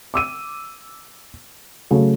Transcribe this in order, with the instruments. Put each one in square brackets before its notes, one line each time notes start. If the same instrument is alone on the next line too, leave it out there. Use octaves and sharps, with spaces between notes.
[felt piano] D6 E6 D#7
C#3 F#3 A3